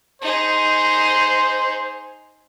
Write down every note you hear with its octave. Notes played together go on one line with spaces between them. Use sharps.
D#4 G#4 C5